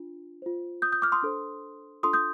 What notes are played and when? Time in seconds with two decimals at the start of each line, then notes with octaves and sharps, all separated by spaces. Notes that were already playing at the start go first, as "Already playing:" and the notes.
Already playing: D4 F4
0.42 F4 C5
0.82 D#6 G6
0.92 D#6 G6
1.02 D6 F6
1.12 C6 D#6
1.23 D4 A4 C5
2.03 D4 F4 A4 C6 D#6
2.13 D#6 G6